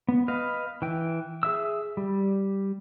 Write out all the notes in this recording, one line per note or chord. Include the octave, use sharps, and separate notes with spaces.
B3
B4 D#5 F5
E3 G5
G#4 E5 E6
G3